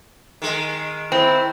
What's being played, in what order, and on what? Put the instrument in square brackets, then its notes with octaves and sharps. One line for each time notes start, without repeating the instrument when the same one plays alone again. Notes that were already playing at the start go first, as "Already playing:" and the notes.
[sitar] D#3 G#3
[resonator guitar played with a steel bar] C4 [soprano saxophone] E4